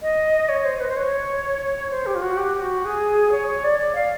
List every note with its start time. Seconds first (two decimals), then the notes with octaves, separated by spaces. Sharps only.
0.02 D#5
0.49 C#5
0.65 C5
0.80 B4
0.89 C5
0.96 C#5
1.91 C5
2.06 G4
2.15 F4
2.22 F#4
2.37 G4
2.60 F#4
2.85 G#4
3.32 C#5
3.47 C#5
3.64 D5
3.79 D5
3.95 F5